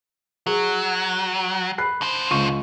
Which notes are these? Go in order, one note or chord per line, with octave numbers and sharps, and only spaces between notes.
F#3 G#4
B5 F#6 C7
D3 C5
C#2 C#6 D#7